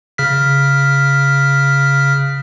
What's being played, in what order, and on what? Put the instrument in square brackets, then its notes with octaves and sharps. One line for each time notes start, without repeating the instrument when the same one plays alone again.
[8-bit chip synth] C#3 F6 B6